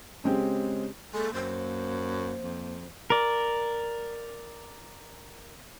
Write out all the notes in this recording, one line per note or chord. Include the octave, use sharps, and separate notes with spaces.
C#3 G#3 C4 G4
G#3 A#3 A4
F#2 C5
F2
A#4 D5